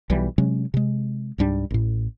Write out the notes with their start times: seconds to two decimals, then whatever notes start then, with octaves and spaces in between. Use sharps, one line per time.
0.10 B1 E3 G3
0.38 C3 F#3 G#3 C#4
0.74 C3 G#3
1.38 C#2 G#2 G3 D4
1.71 A1 A2